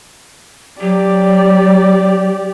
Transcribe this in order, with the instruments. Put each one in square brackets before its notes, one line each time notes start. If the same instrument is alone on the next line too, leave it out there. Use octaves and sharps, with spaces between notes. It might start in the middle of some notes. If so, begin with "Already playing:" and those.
[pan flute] F#3 [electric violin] G4 D5